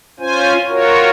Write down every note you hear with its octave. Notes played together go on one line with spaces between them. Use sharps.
C#4 F4 C5 G#5
F4 F#4 A#4 C#5